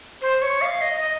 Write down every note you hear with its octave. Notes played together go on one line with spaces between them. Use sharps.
C5
C#5
F5
D#5
D#5